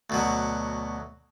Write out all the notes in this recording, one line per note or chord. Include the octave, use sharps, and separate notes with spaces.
D2 B2 F#3